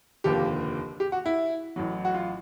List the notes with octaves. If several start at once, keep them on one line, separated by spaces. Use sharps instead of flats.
F1 D#2 D3 F3 A#3 G4
G4
F#4
E4
A1 A2 F#3
F#4
F4